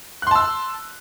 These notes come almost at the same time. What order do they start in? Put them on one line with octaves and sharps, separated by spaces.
F#6 C6 A5 E6